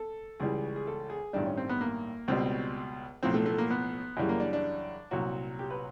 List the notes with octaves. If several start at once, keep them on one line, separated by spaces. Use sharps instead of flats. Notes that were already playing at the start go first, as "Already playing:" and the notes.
Already playing: A4
C#2 C#3 E3 G3 G#4
G#4
A4
G#4
A1 G2 D#3 G3 D4
C#4
C4
B3
A#3
C#2 B2 G3 C4
B1 A2 F3 C4
A3
A3
A#3
B3
F#2 C#3 E3 G3
A#3
D4
D4
C2 A#2 F#3 F#4
G4
B4